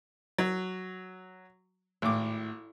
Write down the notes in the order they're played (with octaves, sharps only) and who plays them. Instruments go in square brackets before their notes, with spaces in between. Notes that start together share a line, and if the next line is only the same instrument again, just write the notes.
[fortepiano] F#3
[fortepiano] G#1 D6 [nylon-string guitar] A2